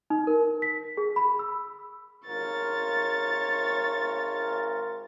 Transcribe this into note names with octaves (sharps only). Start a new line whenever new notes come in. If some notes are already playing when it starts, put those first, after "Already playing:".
D#4
A#4
B6
G#4
B5
E6
G#1 F4 A#4 C#5 A6